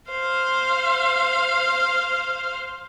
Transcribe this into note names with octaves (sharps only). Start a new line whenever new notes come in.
C5 F5